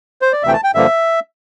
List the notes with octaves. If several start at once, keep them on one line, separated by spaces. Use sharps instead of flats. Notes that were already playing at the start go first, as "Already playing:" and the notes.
C5
D5
D2 C3 E3 A3 E5 G5
A5
G5
G2 D3 F3 A#3 E5